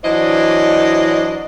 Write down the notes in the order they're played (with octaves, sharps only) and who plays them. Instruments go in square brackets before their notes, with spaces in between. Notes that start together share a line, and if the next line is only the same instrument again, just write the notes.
[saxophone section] E3 F#3 D4 C5 D5 D#5